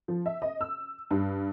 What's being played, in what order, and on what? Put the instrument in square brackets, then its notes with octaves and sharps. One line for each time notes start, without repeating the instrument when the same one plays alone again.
[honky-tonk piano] F3
E5
D#5
E6
G2